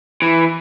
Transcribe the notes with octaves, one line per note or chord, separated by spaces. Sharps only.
E3